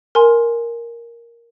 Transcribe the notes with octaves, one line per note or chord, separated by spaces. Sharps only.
A#4 G#5 C6